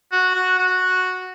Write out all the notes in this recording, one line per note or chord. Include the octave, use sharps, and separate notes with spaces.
F#4
F#4
F#4